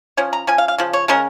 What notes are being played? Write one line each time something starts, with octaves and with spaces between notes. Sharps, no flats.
F3 C#4 C#5
A#5
F3 C#4 G#5
F5
F5
C#3 F3
C#5
C#3 G#3 C#4 A#4